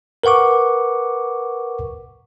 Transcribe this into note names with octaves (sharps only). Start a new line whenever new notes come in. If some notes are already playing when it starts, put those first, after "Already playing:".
A#4 B4 F#5 C#6 D6